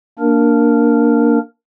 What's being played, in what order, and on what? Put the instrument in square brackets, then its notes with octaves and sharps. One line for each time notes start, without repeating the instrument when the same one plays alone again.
[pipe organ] A#3 D4 A#4